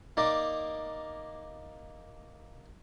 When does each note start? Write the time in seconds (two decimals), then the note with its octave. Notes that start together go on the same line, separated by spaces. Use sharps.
0.17 A#3 D#4 D5 D#5